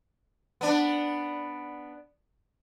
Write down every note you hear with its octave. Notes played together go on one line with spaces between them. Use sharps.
B3 D4